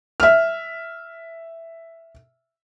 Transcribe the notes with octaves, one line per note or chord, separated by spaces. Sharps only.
E5 F6